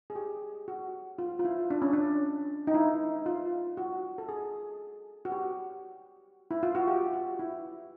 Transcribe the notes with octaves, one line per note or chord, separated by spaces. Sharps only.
G#4
G4
F#4
F4
F4
E4
D4
C#4
D4
D#4
E4
F4
F#4
A4
G#4
F#4
G4
E4
F4
F#4
G4
F#4
E4